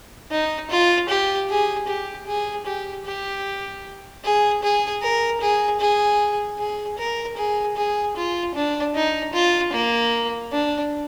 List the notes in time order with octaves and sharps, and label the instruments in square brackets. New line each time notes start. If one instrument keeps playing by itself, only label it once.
[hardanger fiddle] D#4
F4
G4
G#4
G4
G#4
G4
G4
G#4
G#4
A#4
G#4
G#4
G#4
A#4
G#4
G#4
F4
D4
D#4
F4
A#3
D4